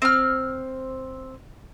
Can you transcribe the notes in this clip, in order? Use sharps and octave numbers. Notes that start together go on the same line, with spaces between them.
C4 F6